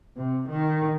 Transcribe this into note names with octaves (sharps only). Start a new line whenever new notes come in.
C3
D#3